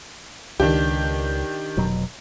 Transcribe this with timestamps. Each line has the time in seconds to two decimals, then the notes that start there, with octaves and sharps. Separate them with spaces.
0.60 C#2 D#3 D4 G4
1.77 F1 B2 F#3